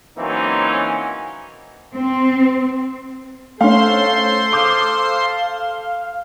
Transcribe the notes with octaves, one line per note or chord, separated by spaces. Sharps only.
E3 F#3 A#3 C4 C#4 D#4
C4
A3 C#4 A4 C5 F5 C6
F5 D6 D#6 G6